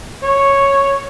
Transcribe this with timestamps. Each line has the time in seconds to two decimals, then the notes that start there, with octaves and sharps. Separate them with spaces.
0.23 C#5